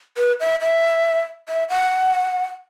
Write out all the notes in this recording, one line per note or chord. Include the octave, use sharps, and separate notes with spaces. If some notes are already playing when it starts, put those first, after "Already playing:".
B4
E5
E5
E5
F#5